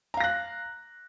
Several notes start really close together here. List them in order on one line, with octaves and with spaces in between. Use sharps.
A#5 F5 A#6 F#6